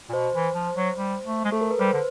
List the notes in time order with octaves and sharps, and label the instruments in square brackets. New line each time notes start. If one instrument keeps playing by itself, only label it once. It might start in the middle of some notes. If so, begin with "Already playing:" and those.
[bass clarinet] A#2
[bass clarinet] B2 [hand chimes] C5
[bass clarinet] E3
F3
F#3
G3
A3
G#3
[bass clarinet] A3 [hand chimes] A4
[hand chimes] A#4
B4
[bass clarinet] G3 [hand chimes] C5
[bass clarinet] D3